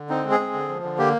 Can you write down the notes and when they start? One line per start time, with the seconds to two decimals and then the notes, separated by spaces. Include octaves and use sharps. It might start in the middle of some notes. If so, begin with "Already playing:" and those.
Already playing: D3
0.09 C4 D#4
0.24 G#3
0.31 G#4
0.40 C4
0.53 D3
0.69 F3
0.83 D3
0.99 A#3 G4